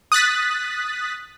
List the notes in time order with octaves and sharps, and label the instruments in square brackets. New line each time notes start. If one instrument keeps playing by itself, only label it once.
[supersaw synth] D#6 F#6 A6 B6